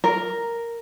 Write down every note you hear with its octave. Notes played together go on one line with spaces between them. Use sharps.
A#4